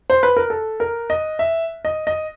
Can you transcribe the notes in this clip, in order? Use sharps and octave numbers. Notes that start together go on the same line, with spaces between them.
C5
B4
A#4
A4
A#4
D#5
E5
D#5
D#5